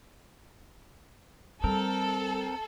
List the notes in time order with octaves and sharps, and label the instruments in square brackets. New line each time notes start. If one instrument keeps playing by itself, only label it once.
[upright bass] G3 [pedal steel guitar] C4 A#4 [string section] A4